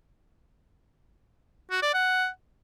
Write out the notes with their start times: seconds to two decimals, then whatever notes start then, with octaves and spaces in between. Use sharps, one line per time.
1.71 F#4
1.82 D5
1.94 F#5